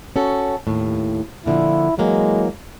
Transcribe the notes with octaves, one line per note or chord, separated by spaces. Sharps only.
C#4 F#4 A4
D#2 A2
A#2 D3 F3 E4
E3 F#3 G#3 A#3